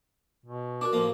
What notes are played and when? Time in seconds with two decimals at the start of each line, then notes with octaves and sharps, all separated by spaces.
0.45 B2
0.81 D4 F#4 A#4 D6
0.93 A1 F3 A#3